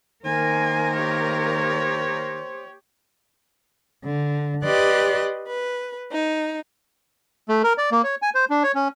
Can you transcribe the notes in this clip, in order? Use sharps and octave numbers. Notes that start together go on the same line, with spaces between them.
D#3 A#3 A#4 C5 G#5
G4 C#5
D3
G4 B4 D5 D#5 C6 F#6
B4
D#4
A3
A#4
D5
A#3
C#5
G#5
C5
D4
C#5
C#4